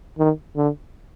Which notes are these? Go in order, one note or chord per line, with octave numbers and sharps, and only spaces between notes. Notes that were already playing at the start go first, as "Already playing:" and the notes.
D#3
D3